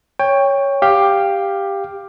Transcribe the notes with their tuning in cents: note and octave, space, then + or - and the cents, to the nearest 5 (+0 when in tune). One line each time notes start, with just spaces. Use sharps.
C#5 +0 G5 +20
G4 +10 F5 +0